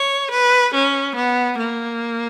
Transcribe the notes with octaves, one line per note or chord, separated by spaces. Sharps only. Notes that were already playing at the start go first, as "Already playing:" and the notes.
Already playing: C#5
B4
C#4
B3
A#3